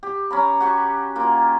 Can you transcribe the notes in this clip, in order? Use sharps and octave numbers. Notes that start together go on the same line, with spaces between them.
G4
C#4 A#5 B5
F#4 G4 C#6
A#3 F4